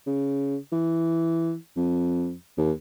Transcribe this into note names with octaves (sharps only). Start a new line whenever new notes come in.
C#3
E3
F2
D#2